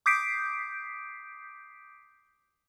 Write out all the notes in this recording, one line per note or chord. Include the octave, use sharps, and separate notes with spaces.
D6 D#6 G6 B6 C7 D7